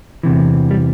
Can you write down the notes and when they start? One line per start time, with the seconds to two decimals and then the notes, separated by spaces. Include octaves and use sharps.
0.23 E2 C3 E3
0.71 G3